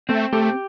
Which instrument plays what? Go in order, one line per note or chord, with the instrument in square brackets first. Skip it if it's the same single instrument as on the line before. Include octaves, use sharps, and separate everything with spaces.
[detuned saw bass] A3 [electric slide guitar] C4
[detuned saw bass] A3 [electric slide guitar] G4